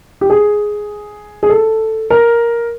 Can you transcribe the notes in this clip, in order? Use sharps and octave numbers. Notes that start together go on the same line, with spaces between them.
G4
G#4
G#4
A4
A#4